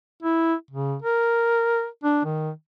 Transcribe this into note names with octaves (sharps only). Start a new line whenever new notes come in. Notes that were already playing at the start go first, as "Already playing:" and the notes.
E4
C#3
A#4
D4
D#3